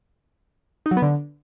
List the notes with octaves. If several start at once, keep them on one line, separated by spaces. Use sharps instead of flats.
D#4
F#3
B3
D3